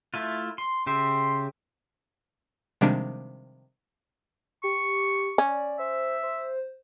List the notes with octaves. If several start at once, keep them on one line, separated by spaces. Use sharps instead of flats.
A3 E4 F4
C6
C#3 G4 E5 C6
C3 D#3 F3 G3 G#3 D4
G4 C#6
C#4 D5
C5 E5
C5